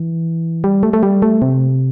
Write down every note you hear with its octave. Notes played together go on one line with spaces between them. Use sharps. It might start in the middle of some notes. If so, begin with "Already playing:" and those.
Already playing: E3
G3
A3
A3
G3
A3
C3